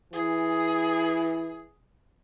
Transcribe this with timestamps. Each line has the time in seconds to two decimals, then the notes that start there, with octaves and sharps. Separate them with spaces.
0.13 E3 G#4